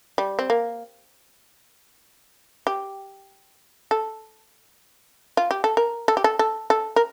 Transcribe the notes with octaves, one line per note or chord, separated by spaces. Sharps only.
G3
C4
A#3
G4
A4
F4
G4
A4
A#4
A4
G4
A4
A4
A4
A#4